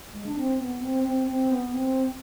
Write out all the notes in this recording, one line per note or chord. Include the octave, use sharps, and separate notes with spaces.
G#3
D4
C4
B3
C4
C4
C4
B3
C4